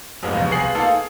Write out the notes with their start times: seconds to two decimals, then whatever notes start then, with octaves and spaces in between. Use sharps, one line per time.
0.23 F2 G#2 F3 G#3 A#3 B3
0.34 D#1 A#1 B2
0.51 C2 B3 F4 G#4 C7 F#7
0.75 A#3 B3 D#4 F4 A4
0.87 G#4